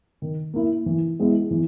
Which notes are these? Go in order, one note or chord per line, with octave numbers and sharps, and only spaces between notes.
D#3
A#3 E4
E3
G#3 B3 E4
E3